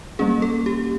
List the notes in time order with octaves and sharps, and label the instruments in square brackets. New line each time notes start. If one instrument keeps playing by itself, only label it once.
[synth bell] G3 A#3 C#4 G#4
A4
G4